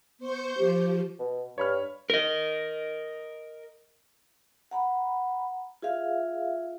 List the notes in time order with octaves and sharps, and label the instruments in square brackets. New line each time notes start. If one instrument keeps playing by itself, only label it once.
[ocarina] B3 [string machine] C5 C#6 G6
[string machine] F3 [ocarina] G4
[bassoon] B2
[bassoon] G2 [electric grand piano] C#5 B5 F6
[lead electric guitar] A#4 D#5
[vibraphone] F#5 A#5 B5
F4 G#4 E5 F5